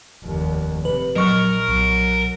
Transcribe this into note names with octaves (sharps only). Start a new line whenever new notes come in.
F1 D#2
C3 B4
A#1 F#3 A#4 D#5 C#6 F6
B1 F#3